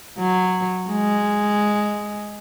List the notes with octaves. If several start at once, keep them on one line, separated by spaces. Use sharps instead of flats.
F#3
G#3